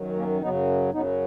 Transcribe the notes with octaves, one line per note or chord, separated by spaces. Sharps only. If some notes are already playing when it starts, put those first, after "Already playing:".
Already playing: F#2 D#3 F#3
A#3 C#4
F#2 C#3 F#3 B3 D#4
F#2 C#3 F#3 B3 D#4